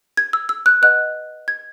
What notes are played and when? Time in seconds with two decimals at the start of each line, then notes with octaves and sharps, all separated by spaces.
0.17 G#6
0.33 E6
0.49 E6
0.66 F#6
0.82 B4 D#5 F#5 F#6
1.48 G#6